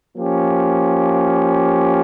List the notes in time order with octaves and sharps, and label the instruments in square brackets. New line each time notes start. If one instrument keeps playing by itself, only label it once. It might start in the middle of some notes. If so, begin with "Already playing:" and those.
[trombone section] F3 A#3 C#4 G4